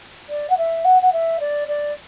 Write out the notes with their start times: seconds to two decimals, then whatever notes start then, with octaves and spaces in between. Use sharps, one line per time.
0.29 D5
0.50 F#5
0.57 E5
0.84 F#5
1.02 F#5
1.12 E5
1.40 D5
1.68 D5